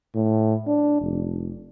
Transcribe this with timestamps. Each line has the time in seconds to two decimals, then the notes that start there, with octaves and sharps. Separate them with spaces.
0.15 A2
0.67 D4
1.01 F1